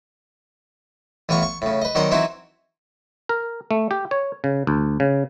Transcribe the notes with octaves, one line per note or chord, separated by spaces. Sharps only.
A1 E3 B3 F4 C#6
C#6
A2 C#3
B4 D#5
D#3 F#3 B3 D5 F#5 C6
E3 C4 D#4 E4 F#4 C5
A#4
A3
G4
C#5
C#3
D2
C#3